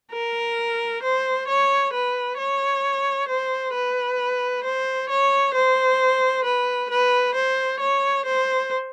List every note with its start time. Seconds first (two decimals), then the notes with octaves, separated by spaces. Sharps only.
0.12 A#4
1.03 C5
1.48 C#5
1.93 B4
2.38 C#5
3.29 C5
3.74 B4
4.64 C5
5.09 C#5
5.54 C5
6.44 B4
6.90 B4
7.35 C5
7.80 C#5
8.25 C5